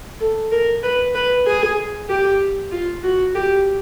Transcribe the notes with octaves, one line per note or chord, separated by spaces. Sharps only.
A4
A#4
B4
B4
G#4
G4
F4
F#4
G4